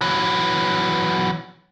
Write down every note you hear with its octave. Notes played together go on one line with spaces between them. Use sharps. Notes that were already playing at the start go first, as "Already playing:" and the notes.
E3 F#3